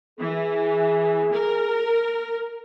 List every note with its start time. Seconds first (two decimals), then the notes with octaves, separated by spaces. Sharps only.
0.19 E3 G#4
1.32 A#4